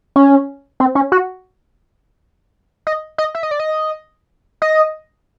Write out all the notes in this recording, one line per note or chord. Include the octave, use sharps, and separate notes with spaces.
C#4
C4
C#4
F#4
D#5
D#5
E5
D#5
D5
D#5
D#5